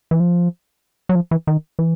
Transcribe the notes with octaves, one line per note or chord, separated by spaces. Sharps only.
E3
F3
F#3
F3
E3
D#3
E3